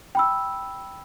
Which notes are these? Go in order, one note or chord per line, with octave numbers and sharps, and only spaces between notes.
G5 B5 E6